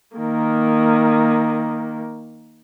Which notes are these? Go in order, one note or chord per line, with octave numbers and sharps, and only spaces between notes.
D#3 A#3